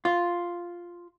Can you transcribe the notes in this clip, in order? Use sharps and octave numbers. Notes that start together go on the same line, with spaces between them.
F4